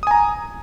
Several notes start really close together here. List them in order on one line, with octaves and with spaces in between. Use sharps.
D#6 G#5 A#5